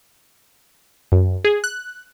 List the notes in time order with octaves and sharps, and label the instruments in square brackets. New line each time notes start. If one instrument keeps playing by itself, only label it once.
[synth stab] F#2
G#4
F#6